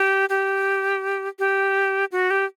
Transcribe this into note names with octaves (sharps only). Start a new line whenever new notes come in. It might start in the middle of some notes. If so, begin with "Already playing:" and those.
Already playing: G4
G4
G4
F#4
G4